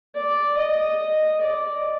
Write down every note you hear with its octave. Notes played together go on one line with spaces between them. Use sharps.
D5
D#5
D5